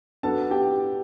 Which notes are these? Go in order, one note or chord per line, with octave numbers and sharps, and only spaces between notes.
F#3 B3 D4 A4 A5
G4 G5